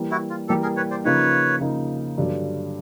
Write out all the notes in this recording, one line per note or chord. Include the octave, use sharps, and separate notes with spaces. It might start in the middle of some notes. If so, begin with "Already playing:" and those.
Already playing: E3 G3 A#3
E4 F#4
F4
E3 G3 A#3 G4 A4
G#4 A#4
B4 C#5
C5 D5
C#3 F3 A#3 D#4 B4 C#5
C#3 F3 A#3 D#4
G2 D3 F#3